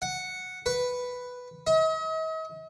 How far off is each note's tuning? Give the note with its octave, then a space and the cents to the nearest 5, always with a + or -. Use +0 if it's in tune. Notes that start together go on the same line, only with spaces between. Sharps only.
F#5 -5
B4 +0
D#5 +45